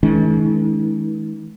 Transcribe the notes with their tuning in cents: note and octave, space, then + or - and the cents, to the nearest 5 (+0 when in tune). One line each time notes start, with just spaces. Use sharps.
D#3 +45 G#3 +35 D4 -45